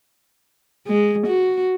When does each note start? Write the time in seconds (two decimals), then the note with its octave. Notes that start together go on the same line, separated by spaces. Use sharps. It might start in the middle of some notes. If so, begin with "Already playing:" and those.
0.87 G#3
1.27 F#4